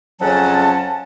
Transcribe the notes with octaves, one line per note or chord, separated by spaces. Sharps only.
F2 C#3 F#3 C#4 F#5 A5